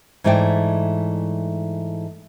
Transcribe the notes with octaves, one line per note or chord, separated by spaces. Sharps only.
G#2 E3 A3 D5 G5